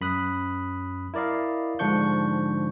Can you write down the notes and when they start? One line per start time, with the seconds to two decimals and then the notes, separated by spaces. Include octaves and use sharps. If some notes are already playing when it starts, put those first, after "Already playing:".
0.01 F#2 B5 D#6 F#6
1.14 E4 A#4 D5 D#5 F5
1.79 G#2 D3 F3 D4 C#6 G6